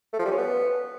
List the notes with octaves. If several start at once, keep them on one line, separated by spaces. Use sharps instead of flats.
A3
F3
G3
C#4
B3